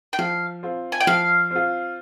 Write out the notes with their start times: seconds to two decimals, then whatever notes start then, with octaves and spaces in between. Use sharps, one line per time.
0.13 G5
0.19 F3 F5
0.63 C4 F4
0.92 G#5
1.00 G5
1.07 F3 F5
1.51 C4 F4